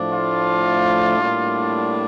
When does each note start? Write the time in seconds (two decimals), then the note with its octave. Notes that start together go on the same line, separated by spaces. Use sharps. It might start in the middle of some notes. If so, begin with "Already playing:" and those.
Already playing: A2 F3 A3 D4
0.13 F4
1.17 A2 G3 A#3 D4